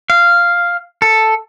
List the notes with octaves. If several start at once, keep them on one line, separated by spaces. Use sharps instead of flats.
F5
A4